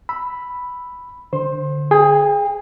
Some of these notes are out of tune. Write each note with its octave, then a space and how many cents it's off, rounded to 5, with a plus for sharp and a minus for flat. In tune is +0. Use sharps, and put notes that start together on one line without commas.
B5 +0 E6 +0
D3 +0 C5 +0 C6 +30
G#4 +5 G5 +40